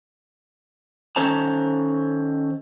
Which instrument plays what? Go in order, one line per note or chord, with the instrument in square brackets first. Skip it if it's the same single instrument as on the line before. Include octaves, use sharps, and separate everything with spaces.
[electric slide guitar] D#3 C#4 A4 C5 A5 A#5